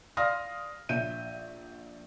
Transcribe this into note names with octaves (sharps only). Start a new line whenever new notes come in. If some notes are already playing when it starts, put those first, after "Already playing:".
D5 F5 C6 D#6 F6 A#6
A#1 E5 G6 D#7